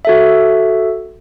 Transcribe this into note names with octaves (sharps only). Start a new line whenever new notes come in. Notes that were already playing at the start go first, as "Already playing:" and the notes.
F#4 A4 E5